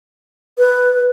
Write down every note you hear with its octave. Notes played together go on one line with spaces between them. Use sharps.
B4